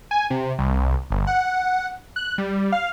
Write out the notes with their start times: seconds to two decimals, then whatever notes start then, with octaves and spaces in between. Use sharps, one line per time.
0.11 G#5
0.30 C3
0.59 C2
1.10 G1
1.27 F#5
2.16 F#6
2.38 G3
2.72 F5